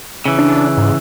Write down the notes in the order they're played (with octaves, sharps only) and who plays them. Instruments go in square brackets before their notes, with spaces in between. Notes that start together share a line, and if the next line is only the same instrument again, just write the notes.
[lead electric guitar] C#3 E3
[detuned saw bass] D4
G#2